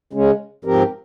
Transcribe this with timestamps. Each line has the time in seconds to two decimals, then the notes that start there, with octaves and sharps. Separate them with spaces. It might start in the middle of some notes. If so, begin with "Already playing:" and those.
0.13 C#3 G#3 C#4
0.65 G#2 F3 C4 G4 A#4